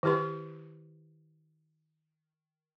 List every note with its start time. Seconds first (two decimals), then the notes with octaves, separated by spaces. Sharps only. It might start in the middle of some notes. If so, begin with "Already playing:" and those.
0.03 D#3 E4 G4 B4 C6